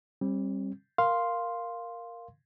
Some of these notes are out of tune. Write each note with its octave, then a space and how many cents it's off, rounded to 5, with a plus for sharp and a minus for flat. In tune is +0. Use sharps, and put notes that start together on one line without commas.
G3 +0 C4 +40
A#4 +0 F5 +0 C6 +0